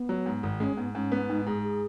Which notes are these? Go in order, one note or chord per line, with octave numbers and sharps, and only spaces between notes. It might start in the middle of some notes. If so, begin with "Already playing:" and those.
Already playing: B3
F#3
G#2
G#1
G#3 C#4
G#2 B3
G#2 C#4
B3
G#2 D#4
G#2 G#4
G#4